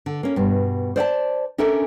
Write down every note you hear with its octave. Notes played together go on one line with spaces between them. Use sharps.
D3
A#3 C#4
G2 B2
C5 D5 F#5 A5
C#4 D4 A4 A#4 E5 G#5